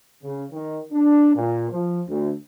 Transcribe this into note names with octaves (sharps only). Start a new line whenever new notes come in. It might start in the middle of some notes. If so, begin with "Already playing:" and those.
C#3
D#3
D4
A#2
F3
D2